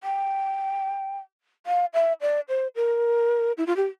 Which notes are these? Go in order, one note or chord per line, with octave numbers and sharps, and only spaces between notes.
G5
F5
E5
D5
C5
A#4
E4
F4
G4